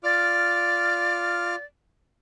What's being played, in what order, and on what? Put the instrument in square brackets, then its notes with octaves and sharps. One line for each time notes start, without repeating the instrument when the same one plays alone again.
[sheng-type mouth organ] F4 D6 F6 [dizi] D5